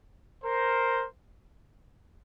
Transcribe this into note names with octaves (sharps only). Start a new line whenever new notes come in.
A#4 C5